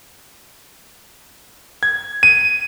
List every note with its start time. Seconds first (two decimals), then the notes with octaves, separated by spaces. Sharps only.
1.83 G#6
2.23 D#7